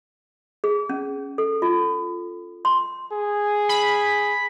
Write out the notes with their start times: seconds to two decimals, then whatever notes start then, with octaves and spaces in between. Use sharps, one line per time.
0.64 G#4
0.89 C#4
1.38 A4
1.62 F4
2.65 C6
3.12 G#4
3.69 B5